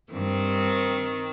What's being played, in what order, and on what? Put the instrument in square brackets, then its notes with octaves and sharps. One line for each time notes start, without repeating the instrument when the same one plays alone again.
[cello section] G2 [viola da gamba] D#3 C4